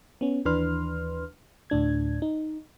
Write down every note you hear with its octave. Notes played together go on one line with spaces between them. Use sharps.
B3 C#4
D#2 E3 D4 B4 C6 F6
D2 A2 D4 G#6
D#4